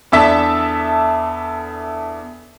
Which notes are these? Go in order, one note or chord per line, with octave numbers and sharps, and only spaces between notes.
E2 D4 A4 E5 A5 B6